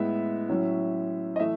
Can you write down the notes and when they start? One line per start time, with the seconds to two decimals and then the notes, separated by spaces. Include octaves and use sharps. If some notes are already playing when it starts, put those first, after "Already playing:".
Already playing: A2 G#3 B3 E5
0.49 A2 F#3 C#4
1.36 D#5
1.39 E3 A3 E5